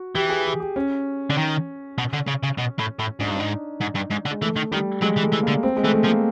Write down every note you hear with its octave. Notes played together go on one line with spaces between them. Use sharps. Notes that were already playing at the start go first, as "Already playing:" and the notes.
Already playing: F#4
E3 G4
G#4
G4
G4
C#4
D3
D#3
B2
D3
C#3
C#3
B2
A2
A2
G#2 D4
G2 D#4
G#2 D4
G#2
G2
G#2
D3
G#3
E3 A3
D#3
D#3 G3
F#3 G#3
E3
A3
E3
A#3
D3
C4
G#3
E3 A3
A3
F3 A#3